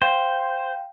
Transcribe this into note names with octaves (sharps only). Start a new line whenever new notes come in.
C5 F5 G5